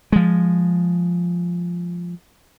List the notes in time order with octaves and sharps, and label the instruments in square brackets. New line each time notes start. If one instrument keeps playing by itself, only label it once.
[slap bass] F3 G#3